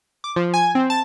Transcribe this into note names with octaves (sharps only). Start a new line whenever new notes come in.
D6
F3
G#5
C4
A5